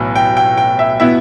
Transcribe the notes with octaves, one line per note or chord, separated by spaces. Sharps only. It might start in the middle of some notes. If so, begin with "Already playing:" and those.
Already playing: B1 A2 E3
G5
G5
G5
E5
B2 B3 E4 E5